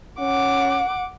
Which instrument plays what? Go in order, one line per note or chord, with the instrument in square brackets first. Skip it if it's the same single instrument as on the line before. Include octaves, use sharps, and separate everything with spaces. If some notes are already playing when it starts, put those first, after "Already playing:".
[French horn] C#4 [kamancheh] F#5 D6